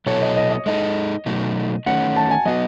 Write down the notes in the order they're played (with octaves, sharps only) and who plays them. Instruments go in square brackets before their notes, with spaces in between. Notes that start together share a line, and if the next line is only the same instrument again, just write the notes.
[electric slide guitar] B2 F#3 B3 E4 A4 [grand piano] C#5
[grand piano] D#5
D#5
D#5
[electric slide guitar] G#3 D#4 A4 [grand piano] D#5
[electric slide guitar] B2 F#3 A3 D#4
[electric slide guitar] D#3 A3 C#4 [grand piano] F#5
[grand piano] A5
G#5
[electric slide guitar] F#3 B3 F#4 [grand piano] D#5